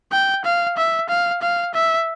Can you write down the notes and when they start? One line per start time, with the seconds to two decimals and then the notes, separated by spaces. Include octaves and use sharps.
0.12 G5
0.45 F5
0.77 E5
1.09 F5
1.42 F5
1.74 E5